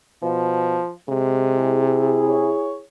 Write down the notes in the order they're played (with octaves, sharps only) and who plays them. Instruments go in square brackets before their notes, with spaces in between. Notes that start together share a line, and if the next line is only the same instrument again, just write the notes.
[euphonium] B2 [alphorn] F3
[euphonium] C3 [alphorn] G#3
[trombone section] E4 G#4
[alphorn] C#5